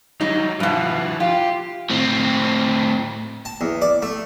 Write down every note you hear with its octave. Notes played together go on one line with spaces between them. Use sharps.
F#3 G3 D#4
G2 B2 F3 E4
F4 G4
A2 C4
A5
E2
D5
A3